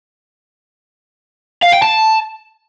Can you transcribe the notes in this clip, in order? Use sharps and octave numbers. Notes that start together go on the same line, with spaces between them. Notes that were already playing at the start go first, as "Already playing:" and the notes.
F5
G5
A5